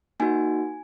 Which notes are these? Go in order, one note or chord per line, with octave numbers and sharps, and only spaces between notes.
A#3 D#4 F#4 G#5